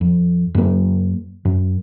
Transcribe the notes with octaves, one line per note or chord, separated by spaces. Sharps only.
F2
F#2 F#3 A#3
F#2